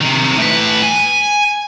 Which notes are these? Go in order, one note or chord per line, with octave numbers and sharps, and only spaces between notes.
C3 D#3
A2 B4
G#5